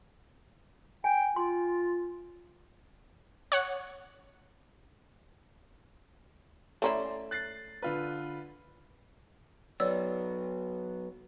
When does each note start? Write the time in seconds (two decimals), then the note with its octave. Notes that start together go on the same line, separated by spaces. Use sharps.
1.04 G5 G#5
1.36 F4 C6
3.52 C#5 F#5
6.82 A3 C#4 E4 D5 A#5 C6
7.31 F#6 A6 C7
7.82 D3 F4 B4
9.80 F#3 B3 C#5 D5 E6